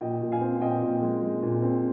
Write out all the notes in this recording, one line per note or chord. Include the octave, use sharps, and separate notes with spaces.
A#2 D#5 G5
A#2
F5 G#5
C4
A#2 D#5 G5
A#2
G#3
G#3
A#2
C4